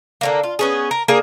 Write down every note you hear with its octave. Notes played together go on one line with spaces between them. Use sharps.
D3 G3 A#3
F4
B3 C#4 G#4
A#4
A#3 D4 G#4 A#4